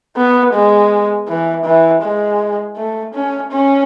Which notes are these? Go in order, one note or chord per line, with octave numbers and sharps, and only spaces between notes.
B3
G#3
E3
E3
G#3
A3
C#4
C#4